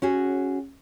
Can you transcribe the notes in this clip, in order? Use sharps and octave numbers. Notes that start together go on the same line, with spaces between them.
C#4 F#4 G#4